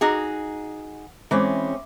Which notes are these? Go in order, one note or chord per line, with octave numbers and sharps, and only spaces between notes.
D#4 F#4 G#4
E3 G#3 C4 C#4